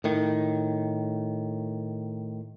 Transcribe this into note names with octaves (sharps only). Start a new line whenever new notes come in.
A2 D#3